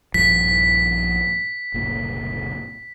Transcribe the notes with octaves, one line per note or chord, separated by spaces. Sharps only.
A#1 G2 F3 B6
F#1 C2 A#2